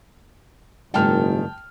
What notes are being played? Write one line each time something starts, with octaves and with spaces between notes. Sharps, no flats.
F#1 G#2 D#3 G3 G5 A5 F6